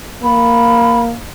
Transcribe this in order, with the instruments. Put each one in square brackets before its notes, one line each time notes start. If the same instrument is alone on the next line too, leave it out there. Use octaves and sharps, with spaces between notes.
[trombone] A#3 [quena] B5